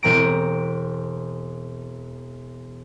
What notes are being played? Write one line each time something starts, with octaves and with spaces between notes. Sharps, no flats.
E1 C4 A#5 D7